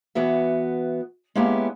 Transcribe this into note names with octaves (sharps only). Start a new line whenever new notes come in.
E3 B3 F#4 E5
G#3 A#3 B3 C#4 E4 G4